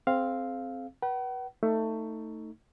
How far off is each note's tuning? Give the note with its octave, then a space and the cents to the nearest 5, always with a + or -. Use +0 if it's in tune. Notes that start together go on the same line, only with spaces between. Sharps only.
C4 +0 G#4 +45 F5 +0
B4 -30 F#5 +45
A3 +20 D#4 +10